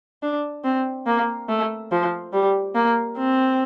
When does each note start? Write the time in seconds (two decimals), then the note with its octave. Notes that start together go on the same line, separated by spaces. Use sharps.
0.23 D4
0.64 C4
1.06 A#3
1.49 A3
1.92 F3
2.33 G3
2.75 A#3
3.18 C4